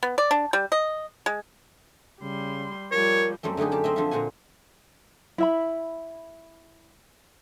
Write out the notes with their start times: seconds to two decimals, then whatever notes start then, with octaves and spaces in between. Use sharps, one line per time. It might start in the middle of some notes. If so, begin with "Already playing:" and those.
0.03 B3
0.18 D5
0.31 D4
0.53 G3
0.72 D#5
1.26 G#3
2.22 C#3 G3 C6
2.92 F3 G3 A#4 C#5
3.43 F#2 G3 A3 C4
3.57 D3 A3 D#4 G4 G#4
3.72 F#2 G4 A5
3.84 C4 D#5 E5
3.96 D3 F3 D4 F4 A4 E5
4.11 A#2 D3 C5 F#5 G#5
5.38 E4 E5 B5